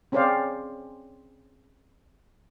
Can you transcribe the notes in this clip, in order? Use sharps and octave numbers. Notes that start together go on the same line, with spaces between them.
C4 C#4 G#4 C5 D5 F5